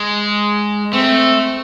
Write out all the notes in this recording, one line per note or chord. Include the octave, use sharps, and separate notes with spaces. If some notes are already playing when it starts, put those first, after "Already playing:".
Already playing: G#3
A3 C4